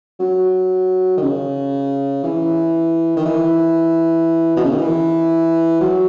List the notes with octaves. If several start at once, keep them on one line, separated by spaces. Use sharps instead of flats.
F#3
D#3
C#3
E3
D#3
E3
B2
C#3
D#3
E3
F#3